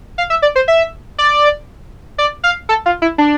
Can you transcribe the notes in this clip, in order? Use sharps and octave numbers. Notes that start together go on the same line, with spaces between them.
F5
E5
D5
C5
E5
D5
D5
F5
A4
F4
E4
D4